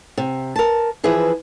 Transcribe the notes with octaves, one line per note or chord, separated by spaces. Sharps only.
C3
A#4 A5
E3 F3 E4 G#4 B4